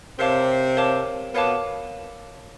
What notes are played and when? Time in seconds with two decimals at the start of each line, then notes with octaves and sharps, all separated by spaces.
0.19 C3 C4 A#4 C#5 F5 A5 D6
0.77 A#4 C#5 F5 A5 D6
1.34 B2 B3 A#4 C#5 F5 A5 D6